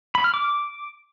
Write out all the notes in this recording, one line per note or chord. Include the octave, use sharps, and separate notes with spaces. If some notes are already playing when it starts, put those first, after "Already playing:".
B5
F6
D6